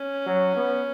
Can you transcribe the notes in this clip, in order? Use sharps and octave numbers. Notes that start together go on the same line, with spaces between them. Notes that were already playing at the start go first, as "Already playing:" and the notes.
Already playing: C#4
F#3
B3